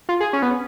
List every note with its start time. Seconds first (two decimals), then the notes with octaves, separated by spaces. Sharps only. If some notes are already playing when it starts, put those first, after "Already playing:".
0.09 F4
0.20 G#4
0.33 C#4
0.42 B3